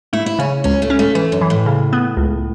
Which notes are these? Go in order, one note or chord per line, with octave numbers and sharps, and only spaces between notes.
A3 E4
E4
C#3 C#4
C#2 C#4
A3
C#4
A3
E3 A3
F#2
E3
A2
C#3
B3
C#2